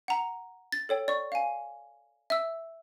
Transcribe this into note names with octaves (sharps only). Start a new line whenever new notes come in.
F#5 A#5
A6
A4 C#5 G5
D5 C#6
F5 G#5
E5 E6